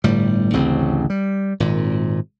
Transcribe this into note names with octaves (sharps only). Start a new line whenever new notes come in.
G1 A2 G3
A1 D2 C#3 C4
G3
G#1 A#2